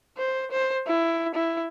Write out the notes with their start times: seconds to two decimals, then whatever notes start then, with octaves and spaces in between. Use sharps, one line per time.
0.17 C5
0.51 C5
0.87 E4
1.35 E4